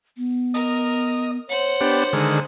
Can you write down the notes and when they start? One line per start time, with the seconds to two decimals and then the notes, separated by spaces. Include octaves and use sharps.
0.17 B3
0.54 A#4 D#5
1.49 C5 C#5 F#5
1.81 B3 D4 G4
2.13 D3 D#3 G#3